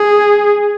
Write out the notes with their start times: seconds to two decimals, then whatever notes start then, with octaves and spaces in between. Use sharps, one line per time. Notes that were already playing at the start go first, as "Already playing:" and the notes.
Already playing: G#4